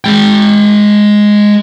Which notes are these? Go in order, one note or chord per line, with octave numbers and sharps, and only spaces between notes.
G#3 G5